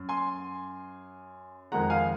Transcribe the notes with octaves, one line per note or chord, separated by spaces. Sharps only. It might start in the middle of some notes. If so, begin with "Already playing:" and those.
Already playing: F#2
G#5 C6
F2 D#3 G#3 F#5 A#5
F5 G#5